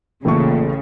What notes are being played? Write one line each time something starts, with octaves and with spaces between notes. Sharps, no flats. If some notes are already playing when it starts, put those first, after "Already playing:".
A1 A#2 C#3 A3 C#6